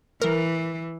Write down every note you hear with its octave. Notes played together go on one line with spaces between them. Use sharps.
E3 A#4